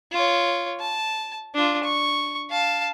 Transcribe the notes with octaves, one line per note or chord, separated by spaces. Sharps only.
F4 C#5
A5
D4 F4
C#6
F5 A5